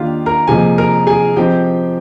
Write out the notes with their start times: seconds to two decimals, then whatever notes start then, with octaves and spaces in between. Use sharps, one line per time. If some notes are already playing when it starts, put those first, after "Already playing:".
Already playing: D#3 A#3 D4 F4 G4 F5
0.26 A#4 A#5
0.47 C3 F3 A#3 D#4 G#4 G#5
0.78 A#4 A#5
1.07 G#4 G#5
1.36 F3 C4 D#4 G4 G5